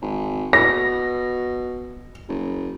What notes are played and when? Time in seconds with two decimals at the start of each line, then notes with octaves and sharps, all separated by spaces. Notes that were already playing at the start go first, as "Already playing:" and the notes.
0.02 G#1
0.53 B2 A#6
2.28 F#1